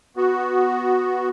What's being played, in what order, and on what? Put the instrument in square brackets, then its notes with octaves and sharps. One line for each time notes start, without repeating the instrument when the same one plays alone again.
[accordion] B3 F#4